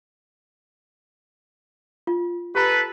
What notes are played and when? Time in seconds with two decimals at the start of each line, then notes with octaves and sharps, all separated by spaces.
2.07 F4
2.55 G4 A4 B4 A#5